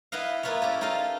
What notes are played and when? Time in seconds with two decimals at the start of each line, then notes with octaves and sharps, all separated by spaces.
0.12 B3 E4 B4 D#5 F5
0.43 A#3 B3 E4 F4 B4 C#5
0.62 C#4 G4 A4
0.81 D#4 F4 A4 D#5 F5